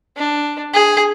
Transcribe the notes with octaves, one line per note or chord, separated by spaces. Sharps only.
D4
G#4